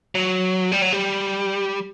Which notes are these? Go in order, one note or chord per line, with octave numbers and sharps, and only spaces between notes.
F#3
G3
F#3
G3